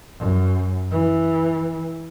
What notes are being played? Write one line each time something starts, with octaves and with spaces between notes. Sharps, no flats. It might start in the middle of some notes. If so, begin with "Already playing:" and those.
F#2
E3